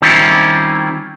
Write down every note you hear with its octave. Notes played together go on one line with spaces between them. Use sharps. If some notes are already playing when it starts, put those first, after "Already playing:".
D#3 G3 C4 C#4 E4 F4